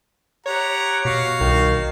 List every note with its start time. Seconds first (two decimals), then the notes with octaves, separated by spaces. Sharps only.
0.46 G4 C#5 F#5 A#5
1.05 B2 F#4 F5
1.41 C2 D#3